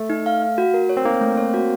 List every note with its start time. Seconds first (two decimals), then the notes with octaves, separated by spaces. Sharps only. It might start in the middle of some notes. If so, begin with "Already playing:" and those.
Already playing: A3
0.10 D#4
0.26 F5
0.42 F5
0.58 F#4
0.74 A#4
0.89 C#5
0.97 C4
1.05 A#3 D#4
1.21 A3
1.37 C#5
1.54 F#4